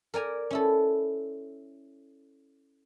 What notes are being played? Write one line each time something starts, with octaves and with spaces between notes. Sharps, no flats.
A#4 D5 G#5 A#5
C#4 E4 A4